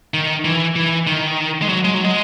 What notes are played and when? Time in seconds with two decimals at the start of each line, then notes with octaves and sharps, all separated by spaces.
0.14 D#3
0.45 E3
0.76 E3
1.07 D#3
1.62 G#3
1.69 F#3
1.85 G#3
1.94 F#3
2.05 G#3